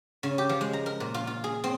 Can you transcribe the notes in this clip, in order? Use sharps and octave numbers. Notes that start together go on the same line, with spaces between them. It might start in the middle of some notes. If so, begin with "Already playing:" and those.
C#3
G4
F3
G#3
A#5
A#4
A#2
F4
F4
G#4
C4